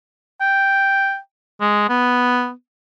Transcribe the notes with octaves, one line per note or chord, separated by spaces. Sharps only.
G5
G#3
B3